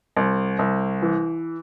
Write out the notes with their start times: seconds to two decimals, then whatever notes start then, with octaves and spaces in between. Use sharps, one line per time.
0.17 C2
0.59 C2
1.02 E3